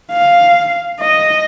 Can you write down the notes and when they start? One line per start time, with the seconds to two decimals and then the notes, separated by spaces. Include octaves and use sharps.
0.11 F5
1.00 D#5